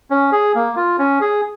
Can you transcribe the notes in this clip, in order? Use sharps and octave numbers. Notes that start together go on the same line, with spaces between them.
C#4
G#4
A#3
F4
C#4
G#4